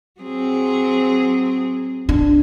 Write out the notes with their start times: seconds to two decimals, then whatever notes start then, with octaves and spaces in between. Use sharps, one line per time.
0.21 F#3 C4 G#4
2.09 D4